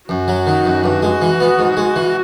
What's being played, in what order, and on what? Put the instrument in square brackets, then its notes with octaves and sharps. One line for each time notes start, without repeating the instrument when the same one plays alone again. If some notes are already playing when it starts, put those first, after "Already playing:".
[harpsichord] F#2 [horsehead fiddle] F#4
[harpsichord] F#3
D#3
F#2
G2
G#3
E3
B3
G#2
G#3
E3